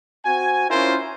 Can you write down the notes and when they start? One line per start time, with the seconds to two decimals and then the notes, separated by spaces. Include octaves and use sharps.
0.25 C4 F#4 G#5
0.70 C#4 E4 F4 A#4 C5